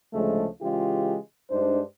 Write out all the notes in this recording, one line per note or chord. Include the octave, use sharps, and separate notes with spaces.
D2 C#3 F3 G#3 A3
C#3 E3 G#3 F4 G4
G2 G#3 D4 D#4 C5